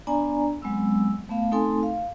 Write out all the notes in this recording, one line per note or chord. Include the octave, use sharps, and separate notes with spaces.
B3 D4 D5 G#5 A#5
F#3 G#3 B3 C4 E6
A3 B3 F5
A3 C4 D#4 A4 G#5 C6
F5